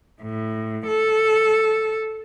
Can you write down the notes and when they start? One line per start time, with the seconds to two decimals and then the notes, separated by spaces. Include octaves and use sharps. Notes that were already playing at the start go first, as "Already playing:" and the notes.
0.22 A2
0.87 A4